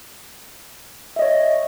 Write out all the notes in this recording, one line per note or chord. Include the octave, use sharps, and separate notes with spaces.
C#5 D#5 E5